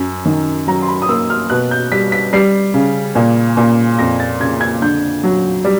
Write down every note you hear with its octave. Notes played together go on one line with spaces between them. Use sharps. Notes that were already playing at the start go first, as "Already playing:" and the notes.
Already playing: F#2
D#3
F#3 A#5
C6
B5
D#6
A#3 E6
F6
B2 F#6
G6
G3 B6
B6
G3 C7
C#3
A#2
A#2
F2 A#6
A6
C#3 G#6
G#6
D3 G6
F#3
G3